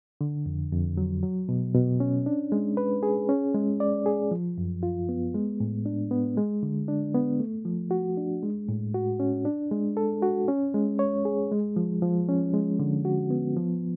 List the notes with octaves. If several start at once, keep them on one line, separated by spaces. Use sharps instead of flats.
D3
F2
F2
F#3
F#3
B2
B2
C#4
D4
G#3
B4
G#4
C#4
G#3
D5
G#4
F3
F#2
F4
B3
G#3
A2
D4
B3
G#3
D3
D4
B3
A3
F3
F#4
D4
G#3
A2
F#4
C#4
D4
G#3
A4
F#4
C#4
G#3
C#5
G#4
G#3
F3
F3
C#4
G#3
D3
F#4
B3
F3